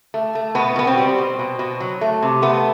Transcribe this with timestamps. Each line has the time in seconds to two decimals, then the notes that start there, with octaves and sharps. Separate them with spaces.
0.14 A3
0.35 A3
0.55 B2 B3
0.76 B2 B3
0.87 C4
0.98 G3
1.18 B2
1.39 B2
1.59 B2
1.80 F#3
2.01 A3
2.22 C3
2.42 A3 B3